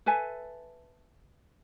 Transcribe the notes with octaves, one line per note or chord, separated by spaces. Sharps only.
A4 B4 E5 G#5